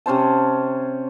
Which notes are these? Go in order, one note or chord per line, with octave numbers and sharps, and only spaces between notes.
C3 C#4 C5 A5